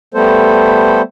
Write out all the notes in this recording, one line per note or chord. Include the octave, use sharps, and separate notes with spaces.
G3 A3 B3 A4 C5